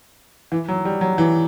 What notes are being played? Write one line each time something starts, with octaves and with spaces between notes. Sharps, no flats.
E3
F#3
G3
F#3
E3